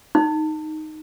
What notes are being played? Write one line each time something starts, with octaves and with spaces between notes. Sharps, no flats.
D#4